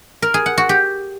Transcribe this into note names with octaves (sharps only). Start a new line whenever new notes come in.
A#4
G#4
F#5
F#4
G4